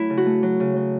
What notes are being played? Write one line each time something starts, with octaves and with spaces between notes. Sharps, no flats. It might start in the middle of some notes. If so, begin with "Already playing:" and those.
Already playing: F#3 A3 E4
C#3
F#4
A3
F#3
C#3
F#3